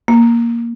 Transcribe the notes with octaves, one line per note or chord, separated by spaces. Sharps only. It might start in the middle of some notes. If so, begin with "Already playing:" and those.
A#3